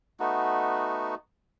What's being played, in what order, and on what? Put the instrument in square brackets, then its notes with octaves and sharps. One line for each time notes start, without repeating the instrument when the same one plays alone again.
[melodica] A3 B3 D#4 F#4